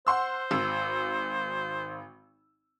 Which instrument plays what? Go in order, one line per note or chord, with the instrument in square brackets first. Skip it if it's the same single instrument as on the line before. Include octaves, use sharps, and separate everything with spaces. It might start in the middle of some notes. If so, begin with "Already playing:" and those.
[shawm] C5 [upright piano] F#5 C6 E6
[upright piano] G#1 E6